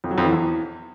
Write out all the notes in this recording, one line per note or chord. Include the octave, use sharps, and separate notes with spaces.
F2
F#3
F2
E3
E2